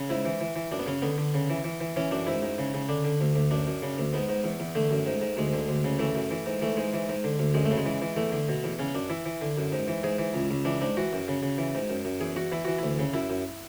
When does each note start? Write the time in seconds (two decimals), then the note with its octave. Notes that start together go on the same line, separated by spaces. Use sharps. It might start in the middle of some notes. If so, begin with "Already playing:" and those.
Already playing: C#3
0.09 G#2 E4
0.25 E3
0.41 E3
0.56 E3
0.72 F#2 D4
0.79 B3
0.87 C#3 C#4
1.02 D3 B3
1.18 D3
1.34 C#3
1.50 E3
1.64 E3
1.81 E3
1.96 E3 C#4
2.11 F#2 D4
2.27 G#2 E4
2.42 G#2
2.58 C#3
2.74 C#3
2.89 D3 D4
3.04 D3
3.21 D2
3.36 D2
3.51 F#2 D4
3.67 F#2
3.82 C#3
3.98 D2
4.14 G#2 B3
4.29 G#2
4.44 E2
4.60 E2
4.75 D3 A3
4.91 F#2
5.06 G#2
5.22 G#2
5.37 D2 G#3
5.54 D3
5.69 D2
5.85 C#3
5.99 E3 A3
6.15 F#2
6.31 E3
6.46 G#2
6.62 E3 A3
6.77 G#2 G#3
6.93 E3
7.09 G#2
7.24 D3
7.39 D2
7.54 F#2 G#3
7.65 A3
7.71 C#3
7.78 G#3
7.86 E3
8.02 E3
8.17 E2 A3
8.32 D3
8.49 B2
8.64 E2
8.79 C#3 C#4
8.95 F#2 D4
9.10 E3 E4
9.26 E3
9.42 D3
9.57 F#2
9.72 G#2
9.88 E3
10.03 G#2 G#4
10.19 E3
10.34 C#2
10.51 C#2
10.65 E3 D4
10.81 G#2 D4
10.97 E3 F#4
11.13 F#2
11.28 C#3
11.43 C#3
11.58 E3
11.75 G#2
11.90 F#2
12.05 F#2
12.20 E2 G#4
12.36 E2 F#4
12.52 E3 E4
12.65 E3 F#4
12.79 D2 E4
12.99 C#3
13.14 F#2 E4
13.30 F#2